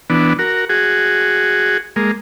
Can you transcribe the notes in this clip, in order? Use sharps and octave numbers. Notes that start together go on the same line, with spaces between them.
E3 B3 D4
F#4 A#4
F#4 G#4
G#3 A#3